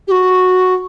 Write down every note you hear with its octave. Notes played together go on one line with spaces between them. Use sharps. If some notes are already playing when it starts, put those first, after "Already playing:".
G4
F#4